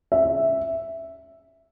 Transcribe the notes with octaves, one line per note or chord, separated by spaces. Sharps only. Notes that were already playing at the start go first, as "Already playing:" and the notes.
E5